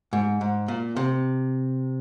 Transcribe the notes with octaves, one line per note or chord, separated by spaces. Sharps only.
G#2
G#2
A#2
C3